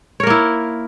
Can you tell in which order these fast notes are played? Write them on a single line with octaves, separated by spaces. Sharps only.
C#5 A#4 A#3 E4